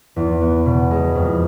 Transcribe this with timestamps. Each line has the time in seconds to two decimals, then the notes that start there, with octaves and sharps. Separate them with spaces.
0.16 E2
0.41 B3
0.66 B2
0.91 G#3
1.15 F2